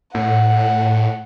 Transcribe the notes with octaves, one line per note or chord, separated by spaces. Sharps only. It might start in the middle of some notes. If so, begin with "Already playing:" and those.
A2 F#5